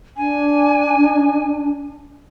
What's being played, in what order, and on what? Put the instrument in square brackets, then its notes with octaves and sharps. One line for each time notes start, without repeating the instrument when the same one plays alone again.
[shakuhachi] D4 [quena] G#5